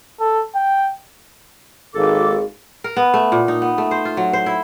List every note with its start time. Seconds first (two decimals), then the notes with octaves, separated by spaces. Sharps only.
0.20 A4
0.55 G5
1.95 G#1 A#3 F#4 G#4 A4 D6
2.84 A#4
2.97 B3
3.14 A3
3.32 A#2
3.48 D#4
3.62 B3
3.78 A3
3.91 C5
4.05 F4
4.17 F#3
4.33 C5
4.46 E4